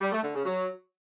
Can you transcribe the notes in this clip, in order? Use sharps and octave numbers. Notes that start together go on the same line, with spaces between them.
G3
A3
D3
C#3
F#3